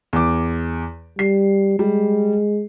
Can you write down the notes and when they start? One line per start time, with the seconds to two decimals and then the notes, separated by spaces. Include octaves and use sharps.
0.13 E2 D6
1.19 G3 C7
1.79 G3 G#3